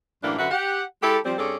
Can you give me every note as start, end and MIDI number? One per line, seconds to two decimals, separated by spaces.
0.23 0.35 42
0.23 0.35 45
0.23 0.35 52
0.23 0.35 58
0.23 0.35 62
0.38 0.49 42
0.38 0.49 50
0.38 0.49 66
0.38 0.49 71
0.38 0.49 76
0.51 0.82 67
0.51 0.82 78
1.02 1.17 56
1.02 1.17 64
1.02 1.17 67
1.02 1.17 69
1.25 1.33 53
1.25 1.33 55
1.25 1.33 60
1.38 1.57 43
1.38 1.57 60
1.38 1.57 61
1.38 1.57 68
1.38 1.57 69
1.38 1.57 74